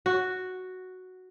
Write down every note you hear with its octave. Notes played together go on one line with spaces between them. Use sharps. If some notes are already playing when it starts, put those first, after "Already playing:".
F#4